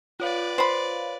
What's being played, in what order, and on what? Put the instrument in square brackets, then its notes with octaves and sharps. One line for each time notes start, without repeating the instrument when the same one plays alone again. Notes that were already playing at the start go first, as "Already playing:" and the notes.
[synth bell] F4 C#5 F5 [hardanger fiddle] B4 D5
[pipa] C5 B5